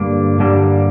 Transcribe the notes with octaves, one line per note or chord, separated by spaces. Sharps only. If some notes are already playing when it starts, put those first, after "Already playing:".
Already playing: G2 D3 G3 A#3 D4
G2 D3 G3 A#3 D4